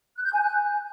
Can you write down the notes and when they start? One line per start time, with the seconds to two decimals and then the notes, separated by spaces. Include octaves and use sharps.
0.16 F#6
0.24 G6
0.33 G#5
0.41 F#6